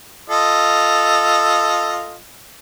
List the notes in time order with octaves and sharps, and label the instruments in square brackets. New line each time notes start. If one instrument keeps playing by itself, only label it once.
[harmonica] F4 A4 D#5